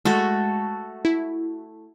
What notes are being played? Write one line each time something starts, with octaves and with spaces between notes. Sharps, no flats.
G#3 A3 F#4 A4
E4